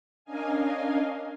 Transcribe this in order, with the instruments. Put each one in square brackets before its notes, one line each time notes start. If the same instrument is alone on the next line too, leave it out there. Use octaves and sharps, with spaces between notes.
[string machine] C#4 D4 A#4 D#5 F5 G#5